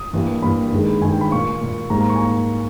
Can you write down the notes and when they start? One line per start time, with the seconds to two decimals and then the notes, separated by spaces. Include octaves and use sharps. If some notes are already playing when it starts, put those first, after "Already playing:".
Already playing: D#6
0.13 G2 E3 G3 A#3
0.42 G2 E3 G3 A#3 B5
0.72 G2 D#3 G#3
1.01 G2 D#3 G#3 G#5
1.12 G5
1.21 B5
1.31 A#2 A#3 C#6
1.61 A#2 A#3
1.90 G#2 G3 A#3 A#5
2.01 A#5
2.10 C#6
2.16 G#5
2.20 A#3 A#5